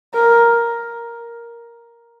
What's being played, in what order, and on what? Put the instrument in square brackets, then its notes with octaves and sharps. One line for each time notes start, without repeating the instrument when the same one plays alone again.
[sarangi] A#4